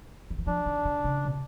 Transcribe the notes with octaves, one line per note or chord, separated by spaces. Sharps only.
D#3
E3
F3 D4
D#3
D3
C#3
B2